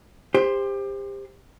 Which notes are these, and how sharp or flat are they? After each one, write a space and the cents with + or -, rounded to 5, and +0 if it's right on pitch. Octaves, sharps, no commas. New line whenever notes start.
G4 +30 C5 +0